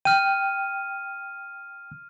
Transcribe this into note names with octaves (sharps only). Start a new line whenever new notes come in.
G5 F6 D#7